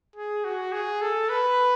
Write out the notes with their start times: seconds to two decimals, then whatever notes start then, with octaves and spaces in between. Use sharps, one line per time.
0.16 G#4
0.45 F#4
0.72 G#4
1.01 A4
1.29 B4